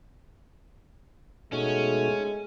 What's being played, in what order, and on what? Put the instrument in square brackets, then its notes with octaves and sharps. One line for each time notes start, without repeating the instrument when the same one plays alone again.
[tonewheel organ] B2 D#4 F#4 [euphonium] G#3 [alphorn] A3 [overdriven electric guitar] C#4